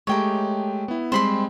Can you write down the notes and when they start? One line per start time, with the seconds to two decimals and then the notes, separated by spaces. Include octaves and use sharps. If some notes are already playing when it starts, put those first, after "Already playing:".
0.07 G#3 A3 G4 C#5 G5 A#5
0.88 B3 E4
1.12 G3 G#3 C4 C5 B5 C6